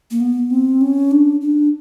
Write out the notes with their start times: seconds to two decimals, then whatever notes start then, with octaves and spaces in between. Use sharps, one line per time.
0.11 A#3
0.20 B3
0.50 C4
0.81 C#4
1.11 D4
1.41 D4